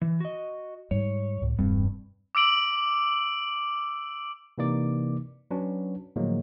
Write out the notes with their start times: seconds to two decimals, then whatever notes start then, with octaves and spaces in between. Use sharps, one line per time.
0.02 E3
0.20 F#4 D#5
0.91 G#2 G3 G#3 C#5
1.42 C#2 A2
1.58 E1 G2 G3 C4
2.35 D6 E6 D7 F#7
4.58 C3 E3 A#3 D#4 D5 D6
5.51 F#3 C#4 D4 B4
6.16 A2 D3 F3 F#3 G#3 A#3